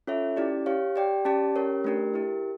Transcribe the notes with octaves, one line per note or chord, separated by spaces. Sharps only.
C#4 F4 A4 C#5 E5
C#4 E4 G4 D5
G4 C#5 F5
G4 D5 G5
C#4 G4 D5 A5
C#4 G4 A#4 C#5
A3 D4 G4 A#4
E4 G4 A#4